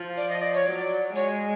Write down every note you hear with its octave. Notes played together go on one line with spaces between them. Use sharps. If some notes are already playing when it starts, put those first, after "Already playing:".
Already playing: F3
D5
D#5
D5
C#5
F#3 D5
G#3 C#5